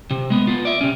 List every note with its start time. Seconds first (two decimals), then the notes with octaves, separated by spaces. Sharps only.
0.11 C3
0.30 G#3 B3
0.47 B3 F4
0.65 D5 E5
0.81 C3 C#4